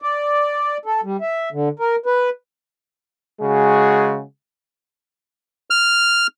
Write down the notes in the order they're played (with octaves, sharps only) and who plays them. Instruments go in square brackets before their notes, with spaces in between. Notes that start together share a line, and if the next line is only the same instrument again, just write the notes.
[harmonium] D5
A4
G3
E5
D3
A#4
B4
[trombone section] C#3 G#3 F#4 G#4
[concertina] F6